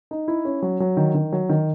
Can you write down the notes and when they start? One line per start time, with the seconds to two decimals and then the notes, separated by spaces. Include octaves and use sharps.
0.11 D#4
0.28 E4
0.45 C#4
0.62 F#3
0.80 F#3
0.97 D#3
1.14 D#3
1.32 F#3
1.49 D#3